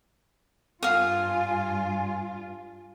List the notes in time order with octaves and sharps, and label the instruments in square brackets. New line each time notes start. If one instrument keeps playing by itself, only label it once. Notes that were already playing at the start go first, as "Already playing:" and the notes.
[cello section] G2 F4 [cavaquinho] F5 D#6 [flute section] G#5